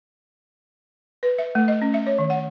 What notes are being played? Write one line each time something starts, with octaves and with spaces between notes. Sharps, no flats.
B4
E5
A3
D#5
C#4
E5
C#5
D#3
F#5